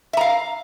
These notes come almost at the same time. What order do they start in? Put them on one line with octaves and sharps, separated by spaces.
E5 A#5 F5